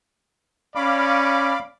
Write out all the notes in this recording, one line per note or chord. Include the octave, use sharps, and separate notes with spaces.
C#4 D5 F5 B5 D6